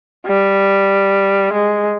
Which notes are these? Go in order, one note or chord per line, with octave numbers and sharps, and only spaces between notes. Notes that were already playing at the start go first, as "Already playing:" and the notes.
G3
G#3